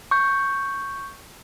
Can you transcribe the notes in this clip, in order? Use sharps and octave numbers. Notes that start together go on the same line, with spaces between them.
C#6 G6